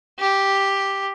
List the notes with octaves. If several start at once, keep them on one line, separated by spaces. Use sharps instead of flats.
G4